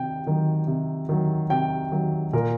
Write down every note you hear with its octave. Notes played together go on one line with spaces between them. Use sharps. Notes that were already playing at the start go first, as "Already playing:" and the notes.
Already playing: C3 D#3 G5
D#3 F#3
C3
D#3 F#3
C3 G5
D#3 F#3
A#2 A#4